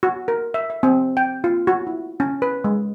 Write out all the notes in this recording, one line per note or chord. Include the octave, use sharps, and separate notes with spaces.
F#4
A#4
E5
E5
C4
G5
F4
F#4
E4
C#4
B4
G#3